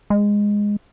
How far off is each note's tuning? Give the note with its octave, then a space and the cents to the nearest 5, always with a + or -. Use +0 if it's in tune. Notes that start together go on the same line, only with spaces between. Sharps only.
G#3 -10